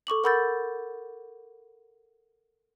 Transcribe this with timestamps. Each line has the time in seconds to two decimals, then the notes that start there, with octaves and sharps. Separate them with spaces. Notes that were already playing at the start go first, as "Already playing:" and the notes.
0.07 A4 C#6 D6 F#7
0.24 A#4 F#5 B5 E6 G6 A6